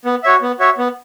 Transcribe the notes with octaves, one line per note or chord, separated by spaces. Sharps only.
B3
F#4 C#5 E5
B3
F#4 C#5 E5
B3